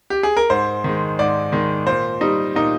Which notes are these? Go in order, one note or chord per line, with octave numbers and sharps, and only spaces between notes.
G4
G#4
A#4
G#2 C5
D#3 G#3
G#2 D5
D#3 G#3
A#2 C5
G3 D#4
A#2 D#4